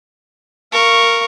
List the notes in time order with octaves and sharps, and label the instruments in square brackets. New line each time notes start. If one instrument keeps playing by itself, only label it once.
[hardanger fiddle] A#4 [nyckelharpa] F5 C#6